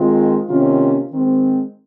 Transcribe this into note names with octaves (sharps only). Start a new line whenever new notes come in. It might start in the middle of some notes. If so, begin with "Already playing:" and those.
Already playing: D#3 G#3 C4 F4
C3 D#3 A#3 C#4 F4
D#3 G#3 C4